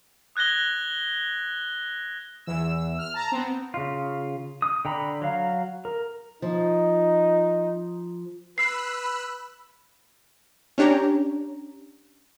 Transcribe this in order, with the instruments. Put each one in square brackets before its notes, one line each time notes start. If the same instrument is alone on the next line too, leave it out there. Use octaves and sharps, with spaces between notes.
[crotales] D#6 F#6 G#6 A#6 G7
[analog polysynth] E2 E6
F6
A5 A#5
B3 C4
[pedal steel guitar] C#3 F4
D#6
D3 G5 A#5 B5
F#3 F5
A#4
[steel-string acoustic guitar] F3 [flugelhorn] D#4
[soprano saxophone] B4 [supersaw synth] B5 E6 F#6 [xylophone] C7
[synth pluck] C#4 D4 G4 C#5 A#5